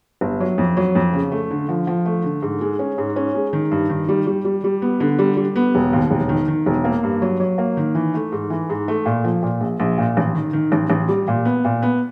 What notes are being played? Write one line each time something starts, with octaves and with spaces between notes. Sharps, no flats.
G1
F#3
F2
F#3
F2
C#3
A3
D3
F3
F3
A3
D3
G#2
G#3
C#4
G#2
C#4
G#3
D#3
G2
D#3
G3
G3
G3
G3
B3
D3
G3
G3
B3
E1
D#2
E1
D#3
D#3
E1
A#3
G2
F#3
F#3
A#3
D#3
E3
A3
G#2
E3
G#2
A3
A#2
F3
A#2
A#1
A#1
A#2
A1
D#3
D#3
A1
A1
G3
A#2
B3
A#2
B3